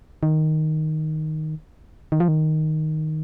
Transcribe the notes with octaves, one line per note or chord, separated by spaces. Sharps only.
D#3
D#3
F3
D#3